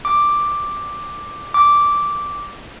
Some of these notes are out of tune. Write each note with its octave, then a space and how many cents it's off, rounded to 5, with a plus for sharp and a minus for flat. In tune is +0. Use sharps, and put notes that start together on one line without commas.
D6 +5
D6 -5